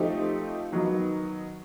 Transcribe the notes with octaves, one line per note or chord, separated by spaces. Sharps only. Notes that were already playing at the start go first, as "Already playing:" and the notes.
Already playing: F3 A3 C4 D#4 G4
D#3 F#3 B3 D#4